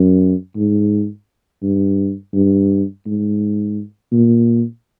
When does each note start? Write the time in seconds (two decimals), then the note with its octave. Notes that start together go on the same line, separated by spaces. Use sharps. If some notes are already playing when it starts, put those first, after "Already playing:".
Already playing: F#2
0.57 G#2
1.63 G2
2.34 G2
3.06 G#2
4.13 A#2